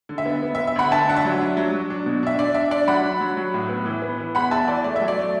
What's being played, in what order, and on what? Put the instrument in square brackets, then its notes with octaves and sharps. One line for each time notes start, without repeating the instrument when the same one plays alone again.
[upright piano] D3
E5
B3
B3
B3 E5
E5
D2 F#5 B5
D2 E5 A5
D4 F#5
E5
F#3
D4
F#3
F#3
D4
B2
D4 E5
D4 D5
D4 E5
D4 D5
F#3 F#5 B5
D4
F#3
F#3
A2
B3
E3
B3
E3
E2 F#5 B5
E2 E5 A5
E3 D5
A3 D5
E5
F#3
D5
A3